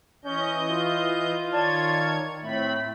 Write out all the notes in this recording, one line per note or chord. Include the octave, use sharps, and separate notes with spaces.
E3 C#4 D#5 G6
F4
D#3 C#5 D5 A5 G#6
A2 A3 C4 B5